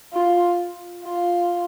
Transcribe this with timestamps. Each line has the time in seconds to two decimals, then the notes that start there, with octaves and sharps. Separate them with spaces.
0.13 F4
1.05 F4